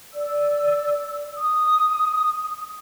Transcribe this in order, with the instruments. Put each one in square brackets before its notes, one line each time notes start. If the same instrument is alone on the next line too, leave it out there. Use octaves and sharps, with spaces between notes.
[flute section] D5 E6
D#6